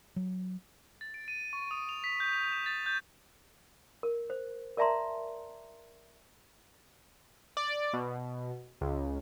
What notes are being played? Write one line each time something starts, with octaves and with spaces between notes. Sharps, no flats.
F#3
A6
D7
D#7
C#6
D#6
F7
B6
G6
F7
E7
A6
G6
A#4
C5
A#4 D5 E5 A5 A#5 C6
D5
B2
C#2